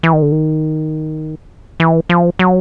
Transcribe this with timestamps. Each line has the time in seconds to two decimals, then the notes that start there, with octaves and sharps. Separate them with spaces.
0.03 E3
0.13 D#3
0.22 D3
0.32 D#3
1.80 E3
2.09 F3
2.39 F#3